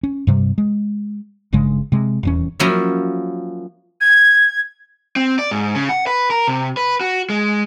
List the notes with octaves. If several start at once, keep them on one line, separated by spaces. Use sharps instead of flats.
C#4
G2 C3 G3
G#3
G1 G2 C#3 G#3
C3 G#3
D#1 E2 C#4
F3 F#3 A#3 C#4 E4
G#6
C4
D5
G#2
C#3
F#5
B4
A#4
C3
B4
F#4
G#3